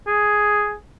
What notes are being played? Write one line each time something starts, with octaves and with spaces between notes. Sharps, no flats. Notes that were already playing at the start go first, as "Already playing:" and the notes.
G#4